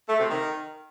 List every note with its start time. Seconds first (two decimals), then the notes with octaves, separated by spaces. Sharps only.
0.07 A3
0.18 C3
0.30 D#3